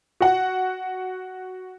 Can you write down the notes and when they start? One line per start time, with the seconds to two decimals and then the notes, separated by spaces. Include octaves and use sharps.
0.21 F#4 F#5